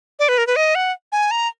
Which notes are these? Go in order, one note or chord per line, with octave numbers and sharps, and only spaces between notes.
D5
B4
A#4
B4
D#5
F#5
G#5
A#5